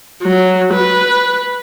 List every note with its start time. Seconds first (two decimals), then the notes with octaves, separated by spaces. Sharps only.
0.23 F#3
0.73 B4